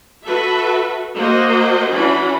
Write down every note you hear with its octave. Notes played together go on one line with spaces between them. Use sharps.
F#4 A4 B4 E5
A#3 F#4 C5 D#5
E3 C#4 D4 F#4 B5